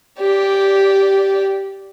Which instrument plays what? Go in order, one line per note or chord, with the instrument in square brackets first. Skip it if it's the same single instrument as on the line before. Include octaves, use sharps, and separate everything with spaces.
[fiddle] G4 D5